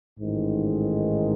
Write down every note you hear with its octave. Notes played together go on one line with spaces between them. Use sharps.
A1 G#2 D#3 G#3